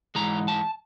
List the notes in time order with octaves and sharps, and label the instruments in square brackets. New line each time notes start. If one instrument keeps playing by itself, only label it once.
[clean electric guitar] G#2 E3 G#3 A#5
A5